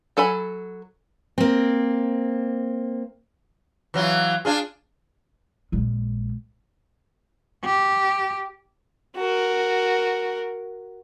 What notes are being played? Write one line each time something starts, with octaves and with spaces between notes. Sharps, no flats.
F#3 A4 G#5 B5
A#3 C4
E3 F#3 F4
D4 F4 G#4
A#1 G#3
G4
F#4 A#4